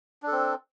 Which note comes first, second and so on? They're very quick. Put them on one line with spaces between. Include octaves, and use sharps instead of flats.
D4 A4 C4